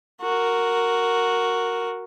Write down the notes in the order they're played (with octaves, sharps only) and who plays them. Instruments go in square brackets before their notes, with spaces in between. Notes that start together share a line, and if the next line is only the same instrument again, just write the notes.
[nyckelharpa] F#4 A#4